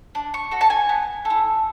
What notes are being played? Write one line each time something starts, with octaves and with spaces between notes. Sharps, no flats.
D4
C#6
F#4 A4
A5
G#5
B3
A4
E4